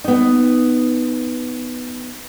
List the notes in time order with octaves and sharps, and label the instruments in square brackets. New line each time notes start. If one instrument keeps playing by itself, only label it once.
[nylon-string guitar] B3 D#4